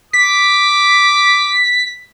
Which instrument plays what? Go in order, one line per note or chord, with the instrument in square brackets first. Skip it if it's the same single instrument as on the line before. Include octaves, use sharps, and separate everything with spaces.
[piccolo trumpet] D6 [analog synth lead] B6